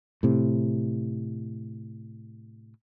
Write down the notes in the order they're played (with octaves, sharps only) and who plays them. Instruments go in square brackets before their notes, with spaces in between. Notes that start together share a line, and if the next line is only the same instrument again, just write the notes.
[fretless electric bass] A2 C3